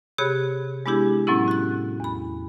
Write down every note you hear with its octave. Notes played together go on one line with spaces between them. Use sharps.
C3 G4 G#4 C#5 B5 F#6
G#3 B3 D4 E4 G4 G#4
A2 F#3 B3 C#4 E4
F#4 F#6
E2 B5